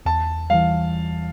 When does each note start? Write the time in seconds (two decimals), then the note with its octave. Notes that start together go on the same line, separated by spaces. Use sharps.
0.05 E2 A5
0.50 E3 G3 F5